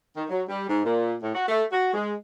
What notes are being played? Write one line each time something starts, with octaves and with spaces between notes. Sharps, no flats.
D#3
F#3
G3
G#2
A#2
A2
F#4
A3
F#4
G#3